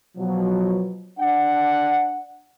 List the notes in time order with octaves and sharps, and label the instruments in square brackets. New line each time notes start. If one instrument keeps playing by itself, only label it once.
[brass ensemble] B2 F3 F#3
D4 F#5